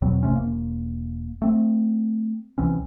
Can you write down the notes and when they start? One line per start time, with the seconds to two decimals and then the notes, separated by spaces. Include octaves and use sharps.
0.02 E2 B2 F#3 C4
0.23 G1 C3 A3 C#4
0.36 E1 A#3
1.42 A3 C4
2.58 C2 E3 C4 C#4